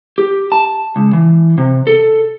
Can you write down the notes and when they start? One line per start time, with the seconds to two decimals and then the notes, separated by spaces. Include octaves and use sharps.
0.18 G4
0.52 A5
0.96 C#2
1.13 E3
1.58 C3
1.87 A4